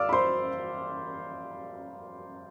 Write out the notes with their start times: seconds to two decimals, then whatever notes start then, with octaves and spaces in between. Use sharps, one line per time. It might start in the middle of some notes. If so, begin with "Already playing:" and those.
Already playing: D5 F5 D6 E6 F6
0.09 B5
0.13 C5 C6